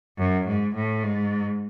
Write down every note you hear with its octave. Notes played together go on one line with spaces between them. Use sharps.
F#2
G#2
A2
G#2